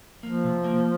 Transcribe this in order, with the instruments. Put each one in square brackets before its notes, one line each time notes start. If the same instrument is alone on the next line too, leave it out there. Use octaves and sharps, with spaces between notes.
[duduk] F3 [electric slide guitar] A#3
[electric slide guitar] C3
A#3